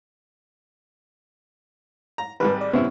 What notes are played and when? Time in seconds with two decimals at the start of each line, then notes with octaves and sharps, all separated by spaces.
2.18 A#5
2.40 G#1 G#2 G3 B4
2.61 D5
2.73 F#2 C3 B3 C4 E4